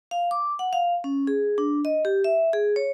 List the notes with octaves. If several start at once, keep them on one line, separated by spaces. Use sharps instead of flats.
F5
D6
F#5
F5
C#4
G#4
D4
D#5
G4
E5
G#4
C#5